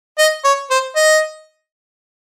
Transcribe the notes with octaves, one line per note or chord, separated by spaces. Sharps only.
D#5
C#5
C5
D#5